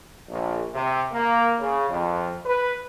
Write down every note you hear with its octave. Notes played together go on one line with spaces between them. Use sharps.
A#1
C3
A#3
C#3
F2
B4